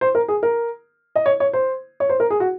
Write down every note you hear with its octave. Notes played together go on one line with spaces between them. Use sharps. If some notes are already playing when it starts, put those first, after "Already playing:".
C5
A#4
G#4
A#4
D#5
C#5
C#5
C5
C#5
C5
A#4
G#4
F#4